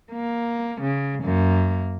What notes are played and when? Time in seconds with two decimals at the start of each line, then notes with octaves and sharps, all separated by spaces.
0.12 A#3
0.81 C#3
1.24 F#2 A#3